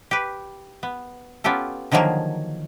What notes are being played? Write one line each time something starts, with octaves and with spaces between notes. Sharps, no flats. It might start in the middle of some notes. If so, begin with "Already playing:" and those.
G4 B4
B3
B3 C#4 F4 G4 A4
D3 D#3 F3 F#3 A#3 G#4